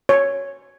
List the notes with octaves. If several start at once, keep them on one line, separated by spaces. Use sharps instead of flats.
C#5